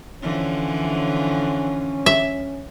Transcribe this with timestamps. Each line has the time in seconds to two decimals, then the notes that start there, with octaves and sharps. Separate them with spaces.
0.22 D3 E3 F3 C#4
2.06 E5